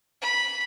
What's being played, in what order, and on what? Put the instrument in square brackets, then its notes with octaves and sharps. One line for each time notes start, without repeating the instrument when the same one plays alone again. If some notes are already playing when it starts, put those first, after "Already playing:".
[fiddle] B5